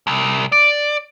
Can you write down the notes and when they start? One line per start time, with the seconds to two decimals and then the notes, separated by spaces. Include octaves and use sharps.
0.07 C2
0.52 D5